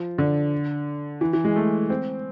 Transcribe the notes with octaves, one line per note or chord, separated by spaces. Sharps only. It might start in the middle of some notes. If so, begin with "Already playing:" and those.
Already playing: F3
D3
E3
E3
G#3
A3
C4